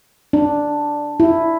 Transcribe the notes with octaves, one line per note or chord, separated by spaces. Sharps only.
D4
E4